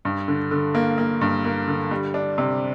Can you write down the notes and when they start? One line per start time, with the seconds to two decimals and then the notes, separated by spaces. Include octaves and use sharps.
0.05 G2
0.28 D3
0.51 D3
0.75 A#3
0.98 A#3
1.21 G2
1.44 A#3
1.68 D3
1.91 G3
2.14 D4
2.38 C3